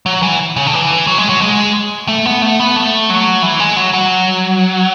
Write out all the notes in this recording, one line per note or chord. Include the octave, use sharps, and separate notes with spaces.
F#3
E3
C#3
D3
E3
F#3
G#3
F#3
G#3
A3
B3
A3
B3
A3
F#3
E3
G#3
F#3
F#3